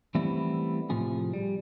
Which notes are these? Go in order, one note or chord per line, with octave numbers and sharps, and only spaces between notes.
E3 G3 A3 B3 C4 E4
A2 C3 F3 G#4
G3